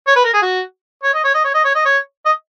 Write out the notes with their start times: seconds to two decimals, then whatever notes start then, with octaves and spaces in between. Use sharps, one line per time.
0.07 C#5
0.16 B4
0.25 A#4
0.34 G#4
0.42 F#4
1.04 C#5
1.14 D#5
1.24 C#5
1.34 D#5
1.45 C#5
1.55 D#5
1.65 C#5
1.75 D#5
1.85 C#5
2.26 D#5